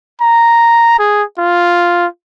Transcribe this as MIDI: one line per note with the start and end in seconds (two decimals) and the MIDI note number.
0.21 0.98 82
0.99 1.23 68
1.39 2.06 65